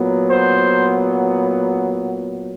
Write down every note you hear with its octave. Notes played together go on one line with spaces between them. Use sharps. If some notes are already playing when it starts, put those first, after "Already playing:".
Already playing: A#2 F#3 B3
C5